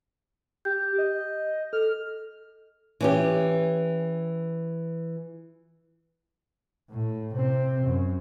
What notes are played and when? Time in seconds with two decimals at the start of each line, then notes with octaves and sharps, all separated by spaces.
0.65 G4 G6
0.98 D#5
1.73 A4 F6
3.01 E3 C#4 G4
6.90 A2
7.34 C3 C4
7.83 F#2